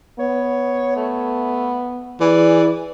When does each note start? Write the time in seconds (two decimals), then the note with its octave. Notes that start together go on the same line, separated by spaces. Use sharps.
0.19 B3 C#5
0.96 A3
2.20 E3 G#4 D5